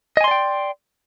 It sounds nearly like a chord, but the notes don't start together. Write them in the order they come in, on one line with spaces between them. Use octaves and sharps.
D#5 G#5 C6 D5 G5